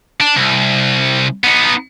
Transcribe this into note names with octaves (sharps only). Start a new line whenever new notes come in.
D4
C2
B3 D#4